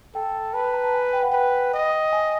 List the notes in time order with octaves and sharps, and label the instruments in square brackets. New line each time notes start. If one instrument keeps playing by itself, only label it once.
[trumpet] A4 [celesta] G5
[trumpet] B4 [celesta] A5
[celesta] B5
A#5
A5
G#5
G5
F#5
[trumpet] B4 [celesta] G5
[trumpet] D#5
[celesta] G#5